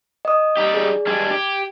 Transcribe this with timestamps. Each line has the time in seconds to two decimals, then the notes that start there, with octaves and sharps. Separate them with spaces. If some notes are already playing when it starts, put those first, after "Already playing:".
0.25 D#5 D#6
0.57 G3 D#4 G4
0.74 G#4 D5
1.07 G3 G#3 D4 G#6
1.31 G4